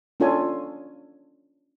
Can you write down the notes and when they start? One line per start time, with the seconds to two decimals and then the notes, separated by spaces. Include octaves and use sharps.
0.20 C#4 D4 F4 A4 C#5 G#5